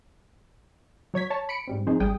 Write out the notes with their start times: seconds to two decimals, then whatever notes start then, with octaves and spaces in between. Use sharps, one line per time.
1.14 F#3 C#5 G#6 B6
1.30 C#5 A5
1.49 B5 C#7 D7
1.68 G#2 G3 C4
1.87 F3 C4 D#4 G#4
2.00 G#1 G3 G#4 G5 D#6